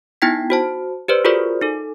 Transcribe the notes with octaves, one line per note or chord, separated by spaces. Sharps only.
B3 D#4 E4 G5 G#6 B6
F#4 C5 A5
G4 B4 C5 D5
F4 F#4 G#4 A#4 C5 D5
D#4 A4